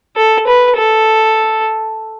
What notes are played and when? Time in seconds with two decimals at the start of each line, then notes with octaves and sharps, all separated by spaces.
0.17 A4
0.47 B4
0.78 A4